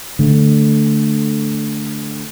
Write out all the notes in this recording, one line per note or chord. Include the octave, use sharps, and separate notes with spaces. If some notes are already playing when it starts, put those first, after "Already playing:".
D3 A3